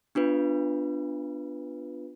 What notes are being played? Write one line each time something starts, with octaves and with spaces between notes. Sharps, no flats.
B3 D4 F4 B4